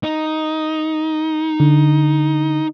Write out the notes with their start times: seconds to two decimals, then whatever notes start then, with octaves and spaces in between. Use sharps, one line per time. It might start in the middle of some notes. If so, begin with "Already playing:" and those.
0.03 D#4
1.60 D3